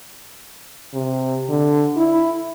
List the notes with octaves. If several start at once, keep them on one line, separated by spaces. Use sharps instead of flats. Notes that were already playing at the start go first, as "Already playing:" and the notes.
C3
D3
E4